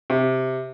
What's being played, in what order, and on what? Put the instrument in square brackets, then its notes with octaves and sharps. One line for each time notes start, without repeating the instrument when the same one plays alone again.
[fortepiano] C3